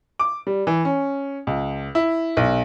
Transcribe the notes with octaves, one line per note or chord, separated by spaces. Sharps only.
D6
G3
E3
C#4
C#2
E4
B1